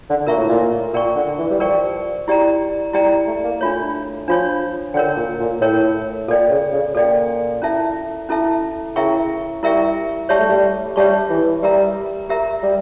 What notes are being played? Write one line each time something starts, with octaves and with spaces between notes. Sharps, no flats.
D3
A#2 A#4 E5 A#5 C#6
A2
A#2
A#2 A#4 D5 G5 C#6
D3
E3
G3
F3 A#4 D5 G5 C#6
E4 G4 D5 G5 A#5
G3 E4 G4 D5 G5 A#5
A3
A#3
A3 D4 F4 C#5
F3 D4 F4 C#5
D3 A#4 C#5 G5
A#2
A#2
A2 A#4 C#5 G5
A#2 A4 D5 G5
C#3
C#3
A#2 A4 D5 G5
C#4 E4 A4 E5 A5
C#4 E4 A4 E5 A5
C#3 E4 A#4 E5 G5 C#6
G3 E4 A#4 E5 G5 C#6
G3 G4 C#5 E5 A5 C#6
A3
G3
G3 G4 C#5 E5 A5 C#6
E3
G3 G4 A#4 E5 A#5
G4 A#4 E5 A#5
G3